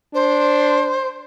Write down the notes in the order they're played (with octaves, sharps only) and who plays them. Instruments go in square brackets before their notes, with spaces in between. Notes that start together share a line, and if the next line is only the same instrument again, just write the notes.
[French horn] D4 [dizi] C5